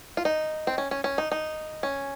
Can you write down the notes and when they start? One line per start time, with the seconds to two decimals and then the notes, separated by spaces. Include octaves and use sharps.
0.17 F4
0.25 D#4
0.67 C4
0.78 C#4
0.91 C#4
1.04 C#4
1.18 D#4
1.32 D#4
1.83 C#4